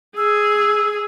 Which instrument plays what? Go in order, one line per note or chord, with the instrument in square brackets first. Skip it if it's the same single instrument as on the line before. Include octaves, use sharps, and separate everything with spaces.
[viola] G#4 [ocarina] E6